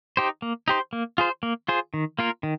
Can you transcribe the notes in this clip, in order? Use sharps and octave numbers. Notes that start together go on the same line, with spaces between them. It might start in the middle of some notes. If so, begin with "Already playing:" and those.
D#4 G4 C5
A#3
D#4 G4 C5
A#3
F4 G#4 C5
A#3
F4 G#4 C5
D#3
A#3 F4 A#4
D#3